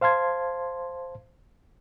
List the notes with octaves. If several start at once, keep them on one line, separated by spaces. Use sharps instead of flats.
C5 F5 A5 C6 G#6